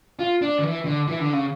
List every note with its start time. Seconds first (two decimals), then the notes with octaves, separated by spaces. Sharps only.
0.19 F4
0.42 D4
0.59 D3
0.63 E3
0.85 D3
1.08 E3
1.20 D3
1.33 C#3